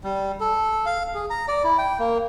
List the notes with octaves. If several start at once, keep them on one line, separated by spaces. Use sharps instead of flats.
G3
A4
F5
G#4
A#5
D5
E4
G5
A#3